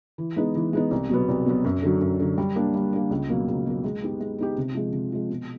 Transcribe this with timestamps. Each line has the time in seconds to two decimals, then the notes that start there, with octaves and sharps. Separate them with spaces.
0.18 E3
0.36 G#3 B3 D#4
0.55 E3
0.73 G#3 B3 D#4
0.91 C2
1.09 B2 F#3 B3
1.29 C2
1.46 B2 F#3 B3
1.65 F#2
1.82 D3 F#3
2.01 F#2
2.20 D3 F#3
2.38 G3
2.56 A#3 D4
2.74 G3
2.93 A#3 D4
3.11 C#2
3.29 B2 F#3 A#3
3.48 C#2
3.66 B2 F#3 A#3
3.84 G#3
4.02 B3 D#4 G4
4.20 G#3
4.38 B3 D#4 G4
4.57 C3
4.75 F3 G#3
4.93 C3
5.12 F3 G#3
5.30 B2